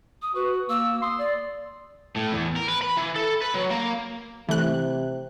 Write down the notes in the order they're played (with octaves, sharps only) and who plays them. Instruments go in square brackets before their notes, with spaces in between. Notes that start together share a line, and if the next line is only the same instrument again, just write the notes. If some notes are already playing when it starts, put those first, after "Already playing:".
[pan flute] D#6
[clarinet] F#4 [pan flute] B4
[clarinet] A#3 [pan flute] E6
[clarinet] C6 [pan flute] D#6
[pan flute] D5
[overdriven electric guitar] A2
E2
A#4
B4
B5
E3
A4
B4
F#3
A#3
[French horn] C3 [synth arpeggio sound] E3 A3 F#6